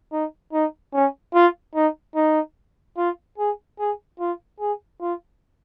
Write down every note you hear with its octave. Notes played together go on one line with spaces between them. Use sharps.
D#4
D#4
C#4
F4
D#4
D#4
F4
G#4
G#4
F4
G#4
F4